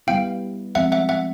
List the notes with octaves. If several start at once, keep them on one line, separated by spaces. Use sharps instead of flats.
G3 B3 E4 F5 G5
F3 G#3 C4 E5 F#5
E5 F#5
E5 F#5